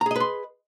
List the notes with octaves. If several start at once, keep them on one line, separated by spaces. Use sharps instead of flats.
G#4 B4 D#5 A#5 C6